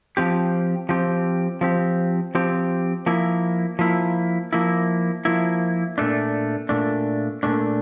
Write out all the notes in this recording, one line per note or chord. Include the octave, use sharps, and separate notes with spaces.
F3 C4 G4
F3 C4 G4
F3 C4 G4
F3 C4 G4
F3 A#3 E4
F3 A#3 E4
F3 A#3 E4
F3 A#3 E4
A#2 A3 D4
A#2 A3 D4
A#2 A3 D4